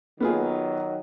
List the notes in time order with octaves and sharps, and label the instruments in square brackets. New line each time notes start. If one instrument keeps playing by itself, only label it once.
[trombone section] D#3 F#3 [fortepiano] B3 F4 G#4